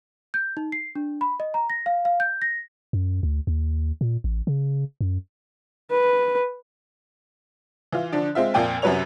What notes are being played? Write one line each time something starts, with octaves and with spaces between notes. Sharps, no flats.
G6
D#4
C7
D4
B5
D#5
A#5
A#6
F5
F5
G6
A#6
F#2
D2
D#2
A#2
A1
C#3
F#2
B4
E3 F4
D3 F3 D4
G#3 C4 F4 E5
F2 A#2 F4 D5 G5 G#5
F#2 C3 F#3 B4 C#5 F7